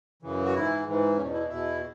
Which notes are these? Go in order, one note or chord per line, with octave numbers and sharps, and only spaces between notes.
F#2 C#3 E3
F#4
G#2 E3 E4
G#2 E3
E2 B2 C#4
E4
E2 B2 E4